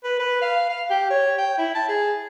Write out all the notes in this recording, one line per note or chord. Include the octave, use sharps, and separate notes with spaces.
B4
B4
F5
F5
G4
C#5
G5
E4
A5
G#4